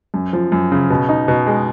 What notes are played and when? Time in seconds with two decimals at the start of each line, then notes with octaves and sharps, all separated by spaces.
0.14 F#2
0.33 F3
0.52 F#2
0.72 C#3
0.90 B2
1.09 D#4
1.28 B2
1.47 G#3